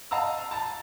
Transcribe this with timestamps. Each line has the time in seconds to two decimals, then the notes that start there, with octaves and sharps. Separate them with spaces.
0.11 D#5 F5 A5 A#5 E6
0.51 A5 A#5 A6